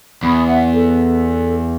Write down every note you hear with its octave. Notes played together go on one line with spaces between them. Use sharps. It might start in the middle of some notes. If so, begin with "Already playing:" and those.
E2 B5 D#6
E5 F#5
A4